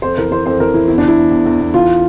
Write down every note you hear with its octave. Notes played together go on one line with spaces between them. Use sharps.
F2 C5
E3 A#4
E3 C5
F2 C5
E3 A#4
E3 E4
E2 E4
D4
E3
E4
E2
E2
E2
E2
E3 F4